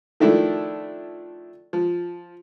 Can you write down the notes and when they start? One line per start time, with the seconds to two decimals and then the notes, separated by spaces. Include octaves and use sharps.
0.20 D#3 F3 A3 D4 E4
1.73 F3